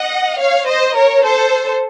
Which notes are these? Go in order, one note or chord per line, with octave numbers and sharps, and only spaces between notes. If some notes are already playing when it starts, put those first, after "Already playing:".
Already playing: D#5 F#5
C#5 F5
C5 D#5
A#4 C#5
A4 C5